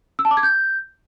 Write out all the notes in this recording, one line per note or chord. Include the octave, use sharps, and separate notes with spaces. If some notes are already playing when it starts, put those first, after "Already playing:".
E6
A5
D6
G#6
G6